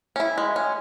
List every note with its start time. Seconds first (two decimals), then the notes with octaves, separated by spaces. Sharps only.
0.16 C#4
0.20 E4
0.38 G#3
0.56 C#4